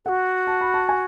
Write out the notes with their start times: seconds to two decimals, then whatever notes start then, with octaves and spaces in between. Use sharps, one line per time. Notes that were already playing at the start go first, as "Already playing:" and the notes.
0.05 F#4 A4 F#5
0.47 A5
0.61 B5
0.74 A5
0.89 G#5